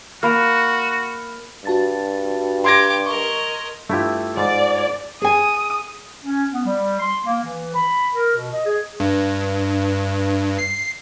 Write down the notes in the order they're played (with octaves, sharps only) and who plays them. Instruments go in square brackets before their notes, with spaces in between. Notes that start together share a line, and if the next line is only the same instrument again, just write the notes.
[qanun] A#3 A#4 [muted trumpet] F#4 [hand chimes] B5 F6
[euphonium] G2 [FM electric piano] F#4 A5 A6
[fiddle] G4 D6 [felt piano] C6 G#6 A#6
[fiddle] A#4 D#5 [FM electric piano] C#6
[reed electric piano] G2 F4 [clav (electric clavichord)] A3 E4 G4
[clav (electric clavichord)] G#2 [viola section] D5
[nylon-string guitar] G#4 G#5 [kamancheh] D#6
[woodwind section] C#4
B3
G3
C6
A#3
E3
B5
A#4
B2
D#5
G#4
[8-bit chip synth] G2
C7